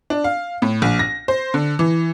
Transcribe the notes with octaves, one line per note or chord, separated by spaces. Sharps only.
D4
F5
A2
A#1
A#6
C5
D3
E3